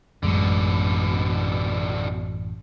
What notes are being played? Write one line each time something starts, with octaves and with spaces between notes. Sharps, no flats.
A1 F#2 B2 D3 G#3